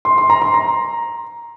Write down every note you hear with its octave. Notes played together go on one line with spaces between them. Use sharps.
C6
C6
A#5
C6
A#5